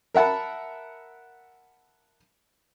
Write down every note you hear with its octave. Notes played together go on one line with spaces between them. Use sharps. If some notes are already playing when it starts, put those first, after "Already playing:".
A#4 E5 F#5 A5 B5